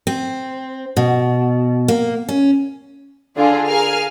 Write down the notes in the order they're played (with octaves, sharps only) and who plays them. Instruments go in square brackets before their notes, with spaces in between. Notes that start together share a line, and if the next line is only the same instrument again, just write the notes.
[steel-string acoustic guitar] C4
B2
A#3
C#4
[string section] D3 D4 F4 G#4
G#4 A#4 F5 G#5 F6